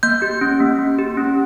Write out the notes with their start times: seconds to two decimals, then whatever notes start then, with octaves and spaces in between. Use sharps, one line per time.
0.03 A#3 G6
0.22 G4
0.41 C#4
0.60 A#3
0.79 A#3
0.99 G4
1.17 C#4